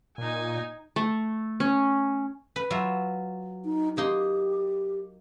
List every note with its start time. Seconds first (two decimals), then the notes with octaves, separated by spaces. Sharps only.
0.18 A#2 D#4 G#5
0.96 A3
1.60 C#4
2.56 B4
2.70 F#3 F4 E5
3.65 D#4
3.97 A#3 D#4 G4 C6